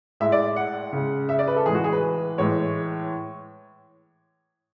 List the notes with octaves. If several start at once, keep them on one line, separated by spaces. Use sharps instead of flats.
A2 G#3 E5
D5
F#5
C#3 G#3
E5
D5
B4
A4
A2 E3 G#3 G#4
F#4
G#4
B4
A2 E3 G#3 C#5